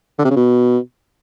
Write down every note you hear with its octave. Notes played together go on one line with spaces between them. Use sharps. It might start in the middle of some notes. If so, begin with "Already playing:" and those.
D3
C3
C#3
B2